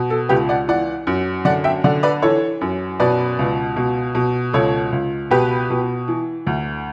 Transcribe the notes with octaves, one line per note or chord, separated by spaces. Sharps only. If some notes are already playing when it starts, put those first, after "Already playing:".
Already playing: B2
A4
C#2 G4 B4
D5 F#5
E3 D5 F#5
F#2
D3 D5 F#5
E5 G5
D3 D5 F#5
B4 D5
E3 A4 C#5
F#2
B2 B4 D5
C#2
B2
B2
C#2 A4 C#5
C#2
B2 G4 B4
B2
E3
D2